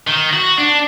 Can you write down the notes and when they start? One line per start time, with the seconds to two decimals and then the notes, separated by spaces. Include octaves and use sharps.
0.07 D#3
0.33 F#4
0.58 D4